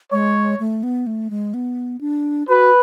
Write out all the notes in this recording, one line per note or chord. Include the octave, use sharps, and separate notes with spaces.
G#3 C#5
A3
B3
A3
G#3
B3
D4
F#4 B4